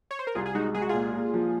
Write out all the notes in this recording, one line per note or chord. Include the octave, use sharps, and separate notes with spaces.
C#5
C5
A#4
C2 F4 G#4
G#4
G#3 D#4 F#4
G#3 G#4
F#4
A#2 F4 G#4
A#2
F3